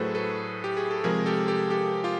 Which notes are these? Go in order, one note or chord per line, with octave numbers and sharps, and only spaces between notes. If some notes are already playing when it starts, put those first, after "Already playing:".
Already playing: A2 F#3 A3 F#4 G#4 A4 B4 C5
A4 B4
G4
G#4
A4
C3 F3 G#3 G#4 A#4
G4 A4
G4 A4
G4 A4
F4 G4